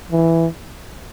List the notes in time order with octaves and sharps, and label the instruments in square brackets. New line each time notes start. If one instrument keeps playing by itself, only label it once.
[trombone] E3